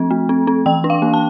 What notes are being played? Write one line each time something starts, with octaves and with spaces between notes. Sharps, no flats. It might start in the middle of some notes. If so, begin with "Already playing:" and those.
Already playing: F3 A3 C4
A3
C4
C4
E3 G5
D4
F5
A#3
A5